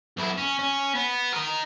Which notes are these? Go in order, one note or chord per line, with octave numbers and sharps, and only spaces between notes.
B1 E4
C#4
C#4
B3
A#4 D#5